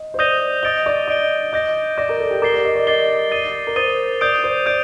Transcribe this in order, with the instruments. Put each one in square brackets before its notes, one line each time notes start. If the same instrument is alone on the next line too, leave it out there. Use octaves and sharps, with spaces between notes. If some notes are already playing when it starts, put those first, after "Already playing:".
Already playing: [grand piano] D#5
C5
[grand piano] D5 [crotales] D#6 G6 A#6 D#7 G7
[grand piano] D#5 [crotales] D#6 A6 D7 G7
[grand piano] D5
[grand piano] D#5 [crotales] D#6 A6 D7 G7
[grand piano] D#5 [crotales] D6 G6 A#6
[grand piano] D5 [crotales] D6 G6 A#6
[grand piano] A#4
A4
G4
[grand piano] A#4 [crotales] D6 A6 C7 G7
[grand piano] D5
D#5
D5
[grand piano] D#5 [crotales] D6 A6 C7 G7
[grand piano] D5 [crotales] D#6 A6 D#7 G7
[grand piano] A#4
[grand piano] C5 [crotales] D#6 A6 D#7 G7
[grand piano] D5 [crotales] D#6 G6 D7
[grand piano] C5
[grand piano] D5 [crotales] D#6 G6 D7